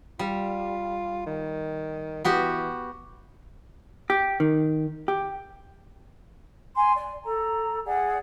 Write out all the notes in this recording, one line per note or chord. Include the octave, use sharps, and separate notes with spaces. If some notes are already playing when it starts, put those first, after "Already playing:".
G3 F4
D#3
E3 B3 F#4 G4
G4
D#3
G4
G#5 C6
D5
A4 A#5
G#4 D5 F#5